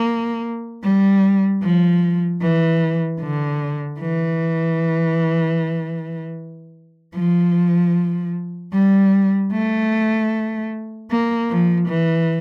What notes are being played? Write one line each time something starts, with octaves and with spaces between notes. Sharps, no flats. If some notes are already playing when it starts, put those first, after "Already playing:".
Already playing: A#3
G3
F3
E3
D3
E3
F3
G3
A3
A#3
F3
E3